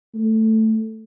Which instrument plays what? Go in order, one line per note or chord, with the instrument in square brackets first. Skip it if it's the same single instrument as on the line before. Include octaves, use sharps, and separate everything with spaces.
[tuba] A3